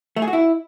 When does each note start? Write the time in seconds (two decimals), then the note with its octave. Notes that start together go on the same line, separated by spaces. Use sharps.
0.16 A3
0.22 G#4
0.27 F#4
0.33 E4